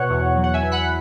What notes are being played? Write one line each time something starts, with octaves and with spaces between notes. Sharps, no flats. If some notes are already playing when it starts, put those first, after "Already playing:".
Already playing: B2 C#5 F#5
E2
F#3
F#5
E5 G#5
E2
F#5 B5